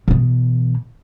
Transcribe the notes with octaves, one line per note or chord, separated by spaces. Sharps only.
B2 E3